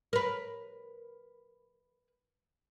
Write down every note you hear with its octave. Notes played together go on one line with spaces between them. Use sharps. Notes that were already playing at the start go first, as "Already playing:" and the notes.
A#4 B4